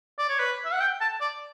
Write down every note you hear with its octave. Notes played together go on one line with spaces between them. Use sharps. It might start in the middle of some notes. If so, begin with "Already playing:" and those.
D5
C#5
B4
E5
F#5
G5
A5
D5